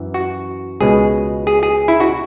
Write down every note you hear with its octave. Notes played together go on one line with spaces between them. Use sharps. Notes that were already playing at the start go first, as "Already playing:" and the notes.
Already playing: F#2 E3
F#4
C#2 B2 G#3 G#4
G#4
G#4
E4
F#4